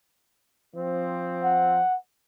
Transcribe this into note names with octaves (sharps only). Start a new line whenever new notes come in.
F3 C4
F#5